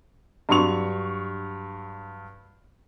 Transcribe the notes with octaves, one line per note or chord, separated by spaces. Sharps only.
G2 F#3 C6 C#6 F7